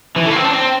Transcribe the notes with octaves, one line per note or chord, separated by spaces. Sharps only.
E3
A3
A#3
C4
D4
C4